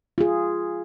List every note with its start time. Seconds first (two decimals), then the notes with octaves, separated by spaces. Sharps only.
0.18 F4 G#4